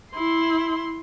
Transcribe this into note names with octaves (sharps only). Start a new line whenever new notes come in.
E4 C6